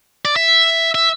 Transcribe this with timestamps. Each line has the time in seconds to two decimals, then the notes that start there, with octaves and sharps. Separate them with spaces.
0.25 D5
0.36 E5
0.95 E5